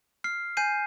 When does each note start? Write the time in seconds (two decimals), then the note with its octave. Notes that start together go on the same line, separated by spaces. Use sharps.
0.24 F6 C7
0.57 G#5 G6 C7 D#7